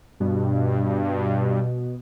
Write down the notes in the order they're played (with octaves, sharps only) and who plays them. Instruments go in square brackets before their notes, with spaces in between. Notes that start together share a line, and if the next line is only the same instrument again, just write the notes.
[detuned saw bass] G2 [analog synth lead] B2